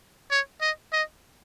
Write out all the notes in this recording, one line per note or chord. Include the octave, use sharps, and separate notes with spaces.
C#5
D#5
D#5